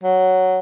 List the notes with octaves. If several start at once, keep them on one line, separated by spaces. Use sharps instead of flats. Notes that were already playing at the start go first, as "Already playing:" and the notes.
F#3